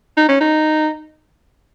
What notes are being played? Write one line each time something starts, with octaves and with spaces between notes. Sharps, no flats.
D#4
C#4
D#4